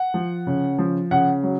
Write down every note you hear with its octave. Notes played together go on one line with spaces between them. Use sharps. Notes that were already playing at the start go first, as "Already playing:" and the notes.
Already playing: F#5
F3
C#3
F3
C#3 F#5
F#3